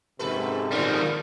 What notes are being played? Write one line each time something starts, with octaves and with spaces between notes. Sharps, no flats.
F2 G#2 C3 A4 B4
D#3 E3 G3 A#4